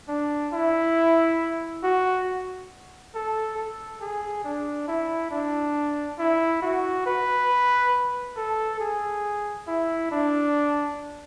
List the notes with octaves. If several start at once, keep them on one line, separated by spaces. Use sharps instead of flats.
D4
E4
F#4
A4
A4
G#4
D4
E4
D4
E4
F#4
B4
A4
G#4
E4
D4